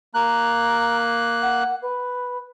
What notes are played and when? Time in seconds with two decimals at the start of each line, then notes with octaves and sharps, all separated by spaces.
0.14 A#3 A#5 F#6
1.42 F#5
1.82 B4